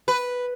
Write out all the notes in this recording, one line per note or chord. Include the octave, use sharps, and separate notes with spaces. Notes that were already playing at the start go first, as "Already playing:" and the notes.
B4